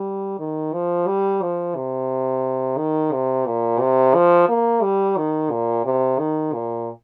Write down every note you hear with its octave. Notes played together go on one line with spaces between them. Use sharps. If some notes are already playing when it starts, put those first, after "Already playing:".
Already playing: G3
D#3
F3
G3
F3
C3
D#3
C3
A#2
C3
F3
A#3
G3
D#3
A#2
C3
D#3
A#2